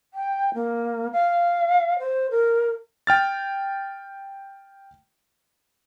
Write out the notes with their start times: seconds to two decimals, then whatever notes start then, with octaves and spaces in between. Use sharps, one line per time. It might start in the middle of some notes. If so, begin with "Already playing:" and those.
0.14 G5
0.54 A#3
1.13 F5
1.99 C5
2.31 A#4
3.07 G5 F6 A6